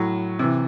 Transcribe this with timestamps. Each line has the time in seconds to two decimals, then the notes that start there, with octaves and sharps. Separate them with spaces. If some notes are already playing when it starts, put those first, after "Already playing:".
Already playing: A2 F#3
0.39 C3 E3